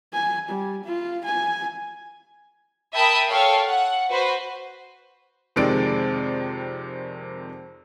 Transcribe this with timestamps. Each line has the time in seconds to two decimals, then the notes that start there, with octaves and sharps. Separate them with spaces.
0.13 G#5
0.49 G3
0.85 F4
1.25 G#5
2.94 A#4 E5 G5 A5 B5 D#6
3.28 A4 C#5 F5 G5
3.66 F#5
4.10 F#4 B4 C5
5.56 F2 C3 D#3 G#3 D5 D7